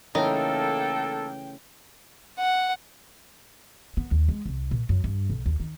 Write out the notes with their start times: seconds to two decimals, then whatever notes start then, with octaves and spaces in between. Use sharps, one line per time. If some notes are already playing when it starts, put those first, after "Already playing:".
0.15 C#3 E3 A3 A#3 D#4 A4 A#4 G5
2.39 F#5
3.97 B3
4.11 D#2
4.29 G#3
4.46 C2
4.71 A#2
4.89 F#2
5.04 G2
5.30 B1
5.46 D#2
5.60 D#3